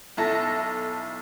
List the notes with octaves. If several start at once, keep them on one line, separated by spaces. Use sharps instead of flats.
B1 E4 A4 A5 A#6